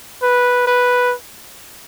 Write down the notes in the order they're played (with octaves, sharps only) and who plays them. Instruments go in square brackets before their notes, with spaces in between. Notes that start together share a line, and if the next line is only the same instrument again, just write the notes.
[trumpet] B4
B4